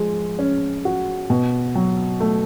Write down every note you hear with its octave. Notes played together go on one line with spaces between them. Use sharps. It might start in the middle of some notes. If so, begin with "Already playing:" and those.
Already playing: F3 G#3
C#4
F#4
B2
F#3
A3